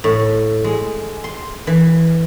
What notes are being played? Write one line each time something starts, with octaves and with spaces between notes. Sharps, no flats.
A2
G#3
C6
E3